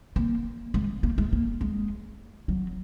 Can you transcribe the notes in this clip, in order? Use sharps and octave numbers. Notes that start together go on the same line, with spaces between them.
A#3
G#3
A#3
G#3
A#3
G#3
F#3